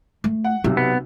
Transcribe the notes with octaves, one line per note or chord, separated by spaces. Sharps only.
A3
F#5
B1 C3 C4
B3